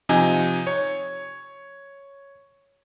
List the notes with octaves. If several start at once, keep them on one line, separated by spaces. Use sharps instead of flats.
C3 F3 D#4 G#5
C#5